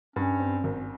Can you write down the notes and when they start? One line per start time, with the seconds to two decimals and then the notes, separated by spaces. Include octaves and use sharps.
0.16 G2 C#4
0.40 C4
0.64 G#1